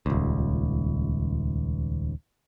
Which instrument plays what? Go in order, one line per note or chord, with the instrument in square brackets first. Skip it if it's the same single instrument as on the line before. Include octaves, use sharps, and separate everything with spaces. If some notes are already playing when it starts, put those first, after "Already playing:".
[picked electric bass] D#1 C#2